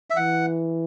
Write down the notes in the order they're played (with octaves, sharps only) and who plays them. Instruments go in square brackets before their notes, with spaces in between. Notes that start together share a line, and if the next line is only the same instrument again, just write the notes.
[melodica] E5
[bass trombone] E3 [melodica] F#5